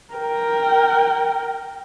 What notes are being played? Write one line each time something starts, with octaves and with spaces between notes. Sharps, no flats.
A#4 G5